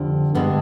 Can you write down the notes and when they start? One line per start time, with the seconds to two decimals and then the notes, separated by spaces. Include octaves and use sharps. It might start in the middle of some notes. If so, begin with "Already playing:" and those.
Already playing: F2 D3 G3
0.35 G2 D3 G#3 B3